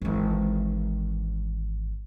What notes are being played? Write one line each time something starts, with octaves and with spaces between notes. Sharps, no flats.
G#1 E3